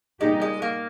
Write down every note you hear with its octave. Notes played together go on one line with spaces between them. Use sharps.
A#2 G3 G#3 A#3 D#4 G4
G#3
A#3